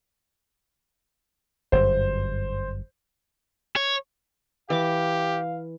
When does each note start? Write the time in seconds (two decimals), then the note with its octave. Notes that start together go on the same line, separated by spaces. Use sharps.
1.72 G1 F#2 C5
3.76 C#5
4.70 E3 G4 F5 D6